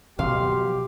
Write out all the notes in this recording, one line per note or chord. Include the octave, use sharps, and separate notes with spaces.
B2 F3 F#3 G4 F5 C6